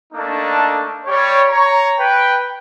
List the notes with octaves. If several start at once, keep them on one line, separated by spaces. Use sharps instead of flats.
A3 A#3 D4 D#4 A4
G3 G4 C#5
C#5 A#5
B4 G5